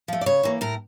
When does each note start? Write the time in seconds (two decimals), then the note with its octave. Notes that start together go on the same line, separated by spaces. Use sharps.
0.08 F3 A3
0.21 D5
0.26 C#3 C#5
0.43 E3 A#3
0.61 A2 A#4